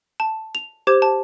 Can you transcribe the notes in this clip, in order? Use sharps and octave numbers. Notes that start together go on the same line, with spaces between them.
A5
F7
G4 C5 D6 G#6 E7
A5